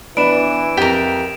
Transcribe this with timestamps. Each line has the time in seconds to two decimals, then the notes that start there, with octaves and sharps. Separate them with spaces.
0.17 E3 B3 D4 B5 D7 E7
0.77 F2 G4 A#4